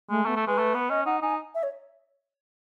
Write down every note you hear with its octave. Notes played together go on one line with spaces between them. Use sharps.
G#3 A3
A3 B3
A3
G#3 B4
A3
B3
C#4 D#5
D#4 F#5
D#4 G#5
E5
C#5